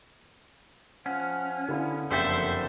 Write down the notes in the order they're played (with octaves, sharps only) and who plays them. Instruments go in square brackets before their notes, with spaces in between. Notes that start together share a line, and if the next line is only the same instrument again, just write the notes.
[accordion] F3 F#5 F6 [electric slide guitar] C#4
[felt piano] D3 E4 F5 [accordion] B3
[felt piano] F#1 F2 [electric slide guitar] D3 G4 A4 [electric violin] C5 E5